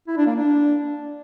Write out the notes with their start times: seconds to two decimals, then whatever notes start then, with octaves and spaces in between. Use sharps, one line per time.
0.07 E4
0.17 D4
0.26 A#3
0.36 D4